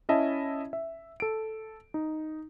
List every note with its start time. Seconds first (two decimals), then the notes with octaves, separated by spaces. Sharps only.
0.09 C#4 E4 D#5 E5 A5
0.73 E5
1.20 A4 D7
1.94 D#4